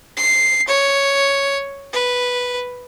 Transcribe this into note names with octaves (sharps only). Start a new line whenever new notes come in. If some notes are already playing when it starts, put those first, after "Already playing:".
C7
C#5
B4